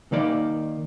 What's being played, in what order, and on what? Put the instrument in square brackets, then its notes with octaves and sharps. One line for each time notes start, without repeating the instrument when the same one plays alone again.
[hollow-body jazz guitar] D#3 A#3 D5